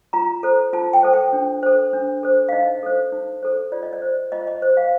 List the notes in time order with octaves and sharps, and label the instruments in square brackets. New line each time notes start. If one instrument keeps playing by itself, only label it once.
[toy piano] F4 A#5
A4 C5
F4 A5
G5
A4 C5
G5
D4
A4 C5
D4
A4 C5
F5
D#4 D#5
A4 C5
D#4
A4 C5
F4 D5
D#5
D5
C5
F4 D#5
D#5
C5
F5